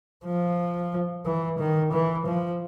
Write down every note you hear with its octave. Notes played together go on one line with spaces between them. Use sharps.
F3
E3
D#3
E3
F3